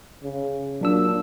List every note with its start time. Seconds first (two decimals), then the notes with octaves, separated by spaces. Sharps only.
0.23 C#3
0.81 A#2 F#3 D4 E6